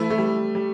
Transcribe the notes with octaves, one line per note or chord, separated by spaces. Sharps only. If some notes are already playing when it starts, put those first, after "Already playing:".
Already playing: E3 A3 E4
A3
G3
G3